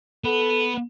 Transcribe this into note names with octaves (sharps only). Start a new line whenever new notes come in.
B3 A4